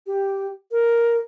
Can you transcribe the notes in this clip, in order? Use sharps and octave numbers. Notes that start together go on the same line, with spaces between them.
G4
A#4